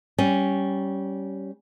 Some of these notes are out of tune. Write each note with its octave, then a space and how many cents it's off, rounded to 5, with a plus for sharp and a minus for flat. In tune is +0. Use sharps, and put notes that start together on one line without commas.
G3 -15 C#4 +0